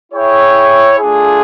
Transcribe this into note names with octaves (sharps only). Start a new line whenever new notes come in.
E4 G#4 C#5 E5 G5
A3 D4 F4 G#4